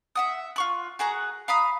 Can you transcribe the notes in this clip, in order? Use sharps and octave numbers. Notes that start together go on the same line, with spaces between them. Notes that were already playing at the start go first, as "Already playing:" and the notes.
E5 F#5 D#6
F4 C#6 F#6
F#4 G#4 F#5 A#5
F5 A#5 B5 D#6